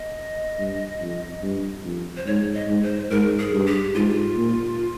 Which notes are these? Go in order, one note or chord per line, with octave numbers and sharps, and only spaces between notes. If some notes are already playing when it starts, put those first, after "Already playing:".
Already playing: D#5
G2
F2
G2
F2
C5
G#2 C#5
D#5
G#2
C5
G#2 A#4
G#4
G2
G4
G#2 F4
A#2